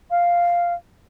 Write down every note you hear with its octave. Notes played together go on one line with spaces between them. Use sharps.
F5